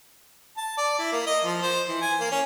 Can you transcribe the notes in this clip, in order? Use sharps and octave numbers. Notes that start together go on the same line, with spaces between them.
A5
D5
E4
A#3
D#5
F3
C5
E3
G#5
A#3
C#4